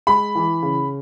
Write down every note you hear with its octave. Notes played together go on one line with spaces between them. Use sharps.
G#3 B5
E3
C#3